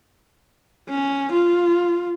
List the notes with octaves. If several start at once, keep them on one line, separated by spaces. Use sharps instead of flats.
C#4
F4